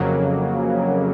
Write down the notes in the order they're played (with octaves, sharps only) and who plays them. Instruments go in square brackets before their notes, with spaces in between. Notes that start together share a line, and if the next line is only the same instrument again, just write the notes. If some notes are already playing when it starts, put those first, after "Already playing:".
Already playing: [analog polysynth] F2 C#3 F#3 A#3